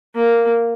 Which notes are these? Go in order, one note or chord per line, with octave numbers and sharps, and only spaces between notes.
A#3